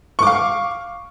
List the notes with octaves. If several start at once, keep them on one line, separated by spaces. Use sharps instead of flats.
F5 C#6 D6